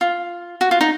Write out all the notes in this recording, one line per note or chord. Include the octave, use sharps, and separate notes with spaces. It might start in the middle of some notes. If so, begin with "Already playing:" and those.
F4
F#4
F4
D#4